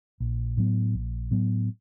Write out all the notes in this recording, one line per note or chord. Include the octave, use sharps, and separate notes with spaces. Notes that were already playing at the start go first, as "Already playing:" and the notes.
A#1
A2 F#3 B3
A#1
A2 F#3 B3